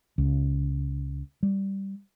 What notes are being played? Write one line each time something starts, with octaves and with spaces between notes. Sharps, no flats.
C#2
G3